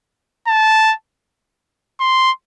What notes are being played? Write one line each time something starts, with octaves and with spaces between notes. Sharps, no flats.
A5
C6